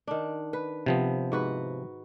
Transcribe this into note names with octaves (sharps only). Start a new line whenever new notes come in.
D#3 D4
B4
C3 F3 B3
G#2 F#4 B4